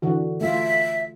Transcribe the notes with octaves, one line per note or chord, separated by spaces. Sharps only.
D3 E3 F#4
A3 F4 E5